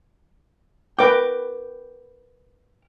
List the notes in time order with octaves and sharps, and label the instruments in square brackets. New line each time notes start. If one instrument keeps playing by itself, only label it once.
[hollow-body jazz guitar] A#4 G5 [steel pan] B4 D6